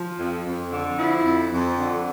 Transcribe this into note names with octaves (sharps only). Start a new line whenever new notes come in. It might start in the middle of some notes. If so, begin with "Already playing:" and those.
Already playing: F3
F2
F2
D3
F3 E4
F2
F2
D3